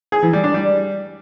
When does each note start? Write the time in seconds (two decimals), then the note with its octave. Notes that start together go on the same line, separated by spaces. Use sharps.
0.12 G#4
0.23 E3
0.33 G3
0.44 D4
0.54 G3